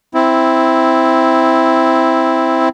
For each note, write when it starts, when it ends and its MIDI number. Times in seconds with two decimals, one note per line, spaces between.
0.14 2.69 60
0.14 2.69 64